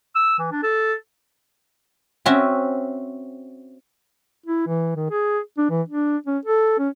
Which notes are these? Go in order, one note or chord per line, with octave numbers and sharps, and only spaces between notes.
E6
E3
D4
A4
C4 C#4 F#4 E5
E4
E3
D#3
G#4
D4
E3
D4
C#4
A4
C#4